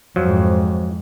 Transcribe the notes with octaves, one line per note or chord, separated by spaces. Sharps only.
F2 G#2 F3 F#3